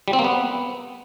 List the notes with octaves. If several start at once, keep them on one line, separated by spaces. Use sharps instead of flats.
G3
C4
A#3
B3